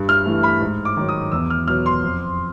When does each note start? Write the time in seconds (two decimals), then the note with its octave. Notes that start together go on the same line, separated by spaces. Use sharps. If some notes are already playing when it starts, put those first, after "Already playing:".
Already playing: G2
0.09 F6
0.25 E3 A3
0.43 B5
0.61 G#2
0.85 D6
0.97 D#3 F#3
1.09 D#6
1.32 E2 E6
1.50 F6
1.67 B2 F#3 B3 F6
1.86 C6
2.03 F2